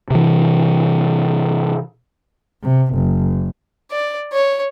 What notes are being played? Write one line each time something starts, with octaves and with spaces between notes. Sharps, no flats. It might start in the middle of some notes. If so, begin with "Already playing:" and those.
C3 E3
C3
F#1
D5
C#5